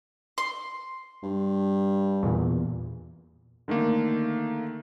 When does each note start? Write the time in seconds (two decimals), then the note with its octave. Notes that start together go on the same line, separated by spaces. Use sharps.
0.38 C6
1.23 G2
2.23 E2 A#2
3.68 D3 D#3 A3 A#3